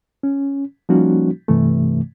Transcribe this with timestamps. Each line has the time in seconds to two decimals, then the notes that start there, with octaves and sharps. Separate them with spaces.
0.23 C#4
0.89 F3 G3 A#3 C#4 D#4 F#4
1.48 G2 C3 E3 A3